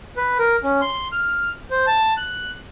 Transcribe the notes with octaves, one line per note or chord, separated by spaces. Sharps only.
B4
A#4
C#4
C6
F6
C5
A5
F#6